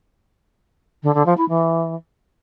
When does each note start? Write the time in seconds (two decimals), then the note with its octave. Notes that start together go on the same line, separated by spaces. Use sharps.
1.03 D3
1.14 D3
1.26 F3
1.37 E4
1.49 E3